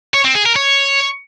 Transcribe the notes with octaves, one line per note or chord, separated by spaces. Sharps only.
C#5
C4
G#4
A#4
C#5